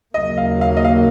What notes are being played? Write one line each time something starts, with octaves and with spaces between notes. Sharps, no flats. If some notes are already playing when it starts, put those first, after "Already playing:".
D#2 C#3 F#3 A#3 D#5
F5
F5
D#5
F5